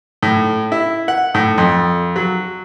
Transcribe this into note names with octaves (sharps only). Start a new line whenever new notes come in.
A2
E4
F#5
A2
F2
F#3